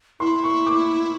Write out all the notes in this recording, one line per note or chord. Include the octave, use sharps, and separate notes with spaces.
E4 C6
C#6
D6